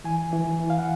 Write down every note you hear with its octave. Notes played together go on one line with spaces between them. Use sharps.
E3 G#5
E3
E3
F5
F#5